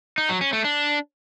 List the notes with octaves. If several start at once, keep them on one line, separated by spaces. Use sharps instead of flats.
D#4
F#3
C#4
A3
D4